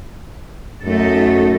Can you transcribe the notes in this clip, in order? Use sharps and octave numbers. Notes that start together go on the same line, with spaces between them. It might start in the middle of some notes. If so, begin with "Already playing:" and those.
F#2 A3 D#4 A4